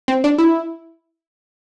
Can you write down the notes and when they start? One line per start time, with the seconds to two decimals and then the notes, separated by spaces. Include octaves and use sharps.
0.08 C4
0.24 D4
0.38 E4